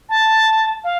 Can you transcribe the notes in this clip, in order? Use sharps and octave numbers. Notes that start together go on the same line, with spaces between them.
A5
F5